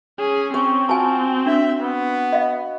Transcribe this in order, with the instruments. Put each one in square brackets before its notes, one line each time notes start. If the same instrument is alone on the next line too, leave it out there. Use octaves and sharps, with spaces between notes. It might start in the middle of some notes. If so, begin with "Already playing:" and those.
[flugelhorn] C#4 [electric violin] G#4
[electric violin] C4 [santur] C#5 G#5
[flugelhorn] F4 [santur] F#4 C5 [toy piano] G#5 A5
[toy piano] D4 [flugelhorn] E5
[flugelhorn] B3
[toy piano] D#5 F5